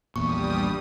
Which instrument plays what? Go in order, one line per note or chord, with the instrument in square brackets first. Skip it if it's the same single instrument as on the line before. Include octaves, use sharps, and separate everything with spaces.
[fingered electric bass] A#1 E2 A#2 [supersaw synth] G2 G3 D#6 [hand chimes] C#6